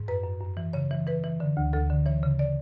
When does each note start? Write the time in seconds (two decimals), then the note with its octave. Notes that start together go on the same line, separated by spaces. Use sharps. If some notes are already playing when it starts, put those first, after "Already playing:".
Already playing: G#2
0.08 F#2 B4
0.24 F#2
0.41 F#2
0.57 E3
0.73 C#3 C#5
0.91 E3
1.06 E3 B4
1.24 E3
1.40 D3
1.57 D2
1.73 D2 A4
1.90 D3
2.06 E3 C#5
2.23 C#3
2.39 D5